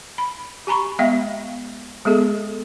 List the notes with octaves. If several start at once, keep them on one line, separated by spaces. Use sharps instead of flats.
B5
G4 G#5 A#5 B5 C#6
G#3 B3 E5 F5 G5
G#3 B3 G#4 A4